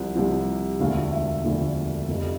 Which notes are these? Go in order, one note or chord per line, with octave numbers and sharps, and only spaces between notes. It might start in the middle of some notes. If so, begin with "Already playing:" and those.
Already playing: C2 C3 F3
C2 C3 F3
E1 D2 D3 F3 A3 F5
E5
E1 D2 D3 F3 A3
F1 F2 C3